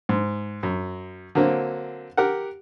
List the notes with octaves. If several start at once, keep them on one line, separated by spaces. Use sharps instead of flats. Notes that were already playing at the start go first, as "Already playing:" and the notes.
G#2
F#2
D3 F#3 A#3 C4
G4 A#4 F#5